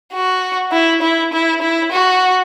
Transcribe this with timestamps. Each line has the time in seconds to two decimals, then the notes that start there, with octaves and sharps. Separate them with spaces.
0.13 F#4
0.72 E4
1.02 E4
1.33 E4
1.62 E4
1.92 F#4